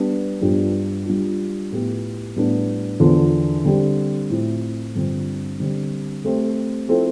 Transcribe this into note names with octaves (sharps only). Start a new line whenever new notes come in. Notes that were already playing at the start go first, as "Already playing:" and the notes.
Already playing: G3 B3 D4
G2 F3 B3 D4 G4
G3 D4 F4
A2 F3 B3 E4 G4
A2 G3 B3 D4
E2 D3 F3
D3 G3 C4 G4
A2 F3 C4 E4
G2 D3 F3 C4
D3 G3 C4
A3 C4 G4
F3 C4 E4 A4